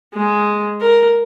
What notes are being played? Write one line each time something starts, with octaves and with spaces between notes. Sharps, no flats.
G#3
A#4